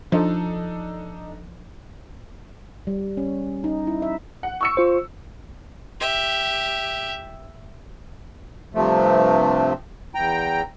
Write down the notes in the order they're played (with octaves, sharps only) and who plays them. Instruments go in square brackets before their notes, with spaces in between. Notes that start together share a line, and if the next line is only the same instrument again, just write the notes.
[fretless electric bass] F3 [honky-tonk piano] D4 D#4 A4
[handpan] G3
C#4
D#4
E4
E5
[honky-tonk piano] F#5
C#6 E6 C#7
[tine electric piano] F4 C5
[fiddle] G4 E5
[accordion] G2 C3 F3 A3
E2 G5 A#5